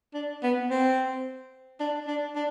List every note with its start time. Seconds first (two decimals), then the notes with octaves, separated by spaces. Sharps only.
0.14 D4
0.43 B3
0.71 C4
1.80 D4
2.08 D4
2.35 D4